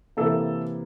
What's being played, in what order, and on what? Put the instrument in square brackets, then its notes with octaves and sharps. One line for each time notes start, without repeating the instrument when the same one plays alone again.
[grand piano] C3 E3 A#3 A4